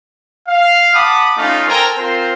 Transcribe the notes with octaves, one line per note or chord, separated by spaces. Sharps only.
F5
F#5 A5 B5 D6 D#6
A3 C#4 D#4 F4
A4 A#4 C5 G5 G#5 A#5
C4 F4 A#4 C5